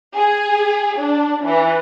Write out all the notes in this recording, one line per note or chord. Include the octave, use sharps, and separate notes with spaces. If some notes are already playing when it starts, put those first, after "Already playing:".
G#4
D4
E3